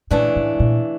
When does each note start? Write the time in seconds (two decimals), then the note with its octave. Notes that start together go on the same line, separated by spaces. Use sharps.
0.11 A#2 C#3 E3 A3 D4
0.36 A2
0.60 A#2